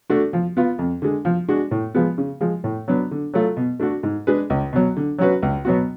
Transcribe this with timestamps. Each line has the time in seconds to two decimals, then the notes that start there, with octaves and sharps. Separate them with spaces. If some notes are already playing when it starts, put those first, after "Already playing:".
0.10 A3 D4 F#4
0.33 F3
0.57 B3 F4
0.79 F2
1.02 D3 G#3
1.25 F3
1.48 G#3 D4 F#4
1.71 A2
1.95 F3 G#3 B3
2.18 C#3
2.41 F3 G#3
2.64 A2
2.88 F#3 B3 D4
3.11 D3
3.34 F#3 A3 F4
3.57 B2
3.80 A3 D4 F#4 A4
4.03 G#2
4.27 G#3 D4 G#4 B4
4.50 C#2
4.73 B2 F#3
4.96 D3
5.19 F#3 C#4 F#4 B4
5.42 C#2
5.65 B2 F#3 B3 F#4